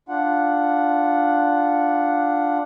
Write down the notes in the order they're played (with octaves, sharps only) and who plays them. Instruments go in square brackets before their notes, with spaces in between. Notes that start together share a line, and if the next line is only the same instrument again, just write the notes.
[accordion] D4 F4 F#5